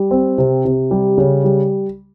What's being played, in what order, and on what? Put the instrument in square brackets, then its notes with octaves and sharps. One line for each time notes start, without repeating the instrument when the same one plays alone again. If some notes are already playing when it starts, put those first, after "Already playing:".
Already playing: [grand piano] G3
C4
C3
C3
G3
C#3
G3